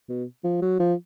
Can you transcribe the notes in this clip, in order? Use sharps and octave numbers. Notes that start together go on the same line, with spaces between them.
B2
F3
F#3
F3